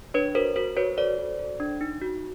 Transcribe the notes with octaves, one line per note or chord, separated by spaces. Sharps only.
D4 B4 C#5
F#4 A#4 C5
F#4 A#4 C5
F#4 B4 C#5
A4 C5 D5
F#4
A4
D4
D#4
F#4